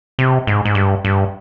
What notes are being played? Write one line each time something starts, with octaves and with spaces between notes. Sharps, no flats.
C3
G#2
G#2
G2
G2